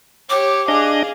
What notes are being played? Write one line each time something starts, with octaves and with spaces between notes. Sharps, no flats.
G4 C#5 D6
D4 G#4 D#5 F5